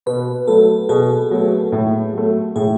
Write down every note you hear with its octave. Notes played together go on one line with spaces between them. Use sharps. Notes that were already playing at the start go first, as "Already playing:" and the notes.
B2 B4
F#3 A3 A4
B2 G#4
F#3 A3
A2
F#3 A3
A2 G#4